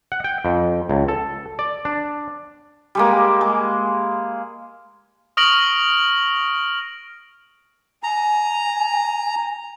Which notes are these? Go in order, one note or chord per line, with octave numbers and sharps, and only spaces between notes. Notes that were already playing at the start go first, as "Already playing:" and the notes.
F#5
G5
F2
C#2
A4
D5
D4
G3 G#3 A#3
G#3
C#6 D#6 F6 A#6 D7 F#7
G#5 A#5